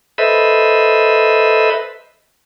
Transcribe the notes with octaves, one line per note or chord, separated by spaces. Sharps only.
A4 B4 C5 D#5 E5 B5